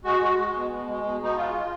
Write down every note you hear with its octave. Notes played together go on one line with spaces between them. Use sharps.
G#3 F#4
G#3
G#3
B2
B2
G#3
B2
B2 D#4
G#3 F4
G#3